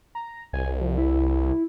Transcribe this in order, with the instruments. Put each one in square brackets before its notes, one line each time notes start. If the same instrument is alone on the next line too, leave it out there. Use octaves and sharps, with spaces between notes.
[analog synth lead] A#5
[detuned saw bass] C2 [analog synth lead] G#5
[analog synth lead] F3
E4